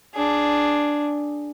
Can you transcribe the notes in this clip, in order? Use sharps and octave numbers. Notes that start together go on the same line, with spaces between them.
D4 G#4